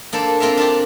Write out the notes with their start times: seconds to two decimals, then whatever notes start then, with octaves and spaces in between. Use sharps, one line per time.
0.13 A#3 D4 A4 C5
0.40 A#3 C4 F4 A#4 E5
0.57 D4 F4 G4